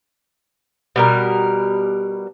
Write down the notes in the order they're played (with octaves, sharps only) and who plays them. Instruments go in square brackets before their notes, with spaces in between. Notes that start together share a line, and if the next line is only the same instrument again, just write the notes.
[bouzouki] B2 G3 A#4